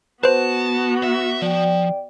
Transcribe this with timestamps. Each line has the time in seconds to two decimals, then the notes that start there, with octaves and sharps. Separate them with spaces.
0.23 B3 F#4 B4 C5 A5
1.03 E5
1.42 F3 D5 G5